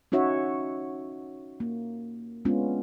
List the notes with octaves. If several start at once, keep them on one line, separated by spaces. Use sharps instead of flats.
C#4 D#4 F#4 C#5 E5
A#3
G#3 B3 C#4 D4 F4